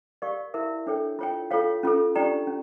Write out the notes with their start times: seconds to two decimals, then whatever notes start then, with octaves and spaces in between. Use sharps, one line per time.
0.22 G4 A#4 D5 F5 C#6
0.54 E4 A#4 E5
0.87 D4 A4 C#5 G5
1.19 F4 C#5 G5
1.51 F4 A4 C#5 F5
1.83 C#4 F4 A4
2.15 D4 G4 D5 G5 A#5
2.47 C#4